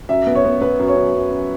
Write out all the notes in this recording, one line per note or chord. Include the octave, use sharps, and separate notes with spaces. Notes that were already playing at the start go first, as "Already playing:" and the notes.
F#2 E5
B3
C#5
B3
B3 B4
F#2
C#5
F#2
F#2
F#2